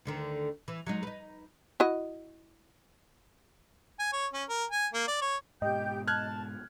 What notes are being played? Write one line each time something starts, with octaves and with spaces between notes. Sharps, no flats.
D2 D3 D#3
E3
F#3 G#3 D#4
D#4 B4
E4 F#4 D#5
G#5
C#5
C#4
A#4
G#5
A#3
D5
C#5
G#2 B2 G4 D#5 G5 G6
A5 F6 F#6 G#6